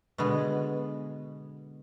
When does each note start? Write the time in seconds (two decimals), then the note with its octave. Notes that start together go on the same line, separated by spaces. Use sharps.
0.18 B2 D3 G#3 B3